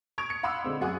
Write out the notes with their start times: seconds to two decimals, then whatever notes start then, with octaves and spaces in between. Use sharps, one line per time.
0.18 C#6 D#6 G#6 D7 F7
0.30 C#7
0.43 F5 F#5 B5 C6 D6 E6
0.64 D3 G#3 C4
0.81 F#2 G#4 F#5 G#5 D6 D#6